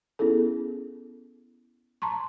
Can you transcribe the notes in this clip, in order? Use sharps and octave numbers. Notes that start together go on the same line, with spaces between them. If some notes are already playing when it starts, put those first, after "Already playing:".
B3 C#4 E4 G#4 A4
A5 A#5 C6 C#6